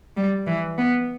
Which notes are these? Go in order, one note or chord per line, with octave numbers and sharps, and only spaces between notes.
G3
E3
B3